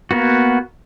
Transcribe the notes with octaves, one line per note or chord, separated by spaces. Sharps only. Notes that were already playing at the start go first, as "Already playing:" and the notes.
A#3 B3 F#4